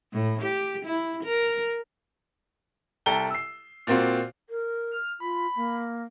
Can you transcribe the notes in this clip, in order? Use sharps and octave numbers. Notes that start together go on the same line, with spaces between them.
A2
G4
E4
A#4
C2 A4 G5 A#5 G7
E6 C7
A#2 A#3 C4 F4 F#4
A#4
F6
F4 B5
A#3